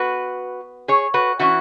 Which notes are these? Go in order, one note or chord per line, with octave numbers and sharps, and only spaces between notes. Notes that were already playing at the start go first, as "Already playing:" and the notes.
Already playing: B3 F#4 B4
G#4 C#5
F#4 B4
E3 C#4 E4 F#4